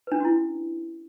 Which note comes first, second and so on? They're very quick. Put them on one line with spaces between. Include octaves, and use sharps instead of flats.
B4 D4 C#4 F#4 E4